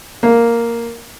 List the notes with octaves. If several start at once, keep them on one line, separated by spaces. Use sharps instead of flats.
A#3